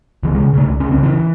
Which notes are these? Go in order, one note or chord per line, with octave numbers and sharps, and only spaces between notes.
C#2 E3
C#3 G#3
C#3 A3
C#2
C#2 C#4
C4
C#3 E3